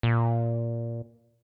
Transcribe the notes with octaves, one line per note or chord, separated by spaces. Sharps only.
A#2